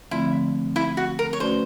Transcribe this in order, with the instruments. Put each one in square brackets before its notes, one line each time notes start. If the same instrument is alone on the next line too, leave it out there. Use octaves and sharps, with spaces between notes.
[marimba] D3 F3 A3 C4 F4 [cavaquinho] E4
[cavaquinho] E4
F#4
A#4
C#5
[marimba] A3 C#4 F#4 B4 D5 [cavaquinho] C5